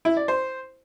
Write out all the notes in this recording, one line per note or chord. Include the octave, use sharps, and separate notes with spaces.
E4
D5
C5